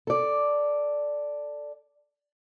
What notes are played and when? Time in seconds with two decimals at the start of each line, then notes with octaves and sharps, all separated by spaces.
0.07 A4 D5